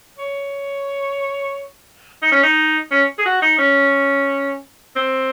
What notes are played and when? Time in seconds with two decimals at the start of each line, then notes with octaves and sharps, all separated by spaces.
0.19 C#5
2.22 D#4
2.32 C#4
2.43 D#4
2.91 C#4
3.19 G#4
3.25 F#4
3.42 D#4
3.58 C#4
4.96 C4